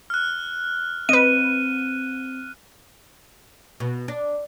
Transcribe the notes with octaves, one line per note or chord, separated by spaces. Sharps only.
F6 F#6
C4 B4 D#5 D#7
B2
D4